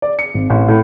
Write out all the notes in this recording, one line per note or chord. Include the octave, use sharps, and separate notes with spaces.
D5
C#7
G#1
A1
A2